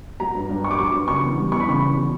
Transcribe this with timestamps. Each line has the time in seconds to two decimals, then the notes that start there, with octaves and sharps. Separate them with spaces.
0.20 F#3 A#5
0.35 G2
0.49 G2
0.64 F#3 C#6
0.71 D6
0.79 F#3 C#6
0.94 G2
1.08 C#3 C#6
1.23 E2
1.38 G3
1.52 E2 C#6
1.60 B5
1.68 C#3 C#6
1.83 E2
1.97 F#3